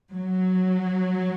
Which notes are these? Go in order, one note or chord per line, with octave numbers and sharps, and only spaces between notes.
F#3